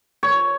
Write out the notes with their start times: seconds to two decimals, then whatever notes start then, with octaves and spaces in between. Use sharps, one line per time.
0.23 C#5